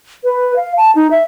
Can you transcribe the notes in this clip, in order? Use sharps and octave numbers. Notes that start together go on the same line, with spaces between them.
B4
F5
A5
D#4
E5